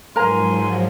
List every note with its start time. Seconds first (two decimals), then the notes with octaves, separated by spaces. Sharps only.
0.16 G#2 B2 F3 F#3 A#4 G#5 A#5 C6